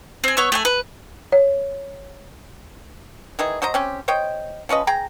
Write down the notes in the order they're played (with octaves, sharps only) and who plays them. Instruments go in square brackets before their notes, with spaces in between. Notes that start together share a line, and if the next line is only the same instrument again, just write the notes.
[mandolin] C4 G#5
B3 C#5 C#6 E6
A3 G5 G#5
B4
[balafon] C#5
[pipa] D#3 E3 G#4
F#3 C5 D#5 A#5
C4 C#4 G4
C5 C#5 D#5 G5
F3 C#4 B4 D#5
G#4 G5 A#5